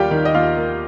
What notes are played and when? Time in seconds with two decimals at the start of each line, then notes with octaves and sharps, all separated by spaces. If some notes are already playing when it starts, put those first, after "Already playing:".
Already playing: D#2 G3 A#3 F4 G4 G5
0.11 D#3
0.25 D#5
0.34 D#2 F4 F5
0.57 A#3